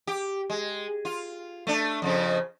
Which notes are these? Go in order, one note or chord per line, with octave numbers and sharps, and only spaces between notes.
G4
G#3
F4
A3 D4
F2 C#3 F3